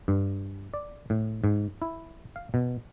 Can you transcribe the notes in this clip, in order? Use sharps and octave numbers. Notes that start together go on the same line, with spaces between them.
G2
D5
A2
G#2
E4
F5
B2